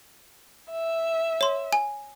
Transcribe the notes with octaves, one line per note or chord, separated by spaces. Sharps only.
E5
C#5 C6
G#5